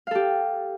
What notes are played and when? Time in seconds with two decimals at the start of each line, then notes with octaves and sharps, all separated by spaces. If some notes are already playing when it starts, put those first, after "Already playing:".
0.07 F5
0.11 A4
0.15 G4